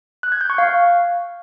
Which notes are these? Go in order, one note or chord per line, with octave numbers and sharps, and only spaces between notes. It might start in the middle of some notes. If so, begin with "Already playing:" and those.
F#6
G#6
G6
C#6
F5